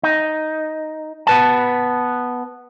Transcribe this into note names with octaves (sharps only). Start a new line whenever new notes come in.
D#4
B3 B4 A5